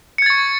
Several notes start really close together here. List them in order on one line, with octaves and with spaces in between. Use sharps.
C#7 G#6 A6 C#6